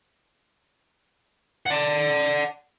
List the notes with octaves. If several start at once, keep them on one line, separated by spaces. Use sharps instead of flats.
D5 F#5